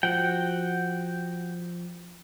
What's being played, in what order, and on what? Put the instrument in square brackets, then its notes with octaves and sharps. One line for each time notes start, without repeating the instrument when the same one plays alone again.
[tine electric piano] F3 [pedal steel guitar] F#4 F#5 G5